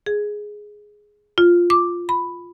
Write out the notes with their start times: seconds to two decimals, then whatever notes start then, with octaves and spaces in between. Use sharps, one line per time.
0.06 G#4
1.38 F4
1.70 D6
2.09 B5